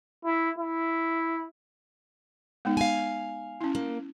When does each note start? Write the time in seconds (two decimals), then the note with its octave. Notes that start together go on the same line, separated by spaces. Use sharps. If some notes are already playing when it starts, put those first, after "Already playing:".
0.25 E4
0.58 E4
2.65 G#3 B3 D#4
2.77 F5 G#5
3.61 C#4 E4
3.75 A#3